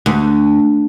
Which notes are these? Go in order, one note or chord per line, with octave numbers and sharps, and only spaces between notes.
D2